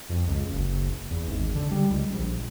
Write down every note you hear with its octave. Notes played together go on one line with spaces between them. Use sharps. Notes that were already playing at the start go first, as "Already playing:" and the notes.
F2
C#2
F#1
E2
G#1
D3
G3
C#2
A#1